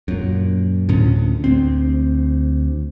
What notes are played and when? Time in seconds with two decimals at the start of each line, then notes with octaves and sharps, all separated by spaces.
0.08 F#2 A#2
0.89 D2 A2 C#4
1.44 D2 C4